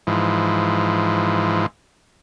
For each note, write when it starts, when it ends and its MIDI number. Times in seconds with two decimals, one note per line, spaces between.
0.07 1.66 44
0.07 1.66 52
0.07 1.66 53